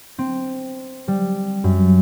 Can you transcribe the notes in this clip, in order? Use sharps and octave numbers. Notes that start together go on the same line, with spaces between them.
C4
G3
F#2